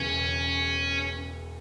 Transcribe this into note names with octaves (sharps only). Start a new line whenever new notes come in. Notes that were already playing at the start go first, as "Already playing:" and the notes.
Already playing: E1 E2 C#3 C#4